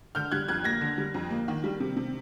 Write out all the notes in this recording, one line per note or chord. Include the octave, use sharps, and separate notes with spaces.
D3 F6 G6
G3 F#6 G#6
F2 F#6 G#6
A#3 G#6 A#6
D3
G3
F2
A#3
D#3
G3
C3
C3